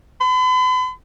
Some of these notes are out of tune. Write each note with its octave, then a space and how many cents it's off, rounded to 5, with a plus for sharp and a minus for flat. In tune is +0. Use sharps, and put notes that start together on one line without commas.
B5 +45